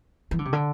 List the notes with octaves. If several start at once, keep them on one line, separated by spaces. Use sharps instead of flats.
E3
D3
C3
D3